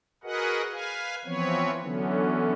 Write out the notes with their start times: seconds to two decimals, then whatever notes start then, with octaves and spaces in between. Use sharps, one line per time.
0.24 F#4 G#4 A#4 B4 D#5 F#5
0.72 B4 F5 G#5
1.25 E3 F3 B3 C4 B4 C#5
1.83 D3 E3 F#3 B3 C#4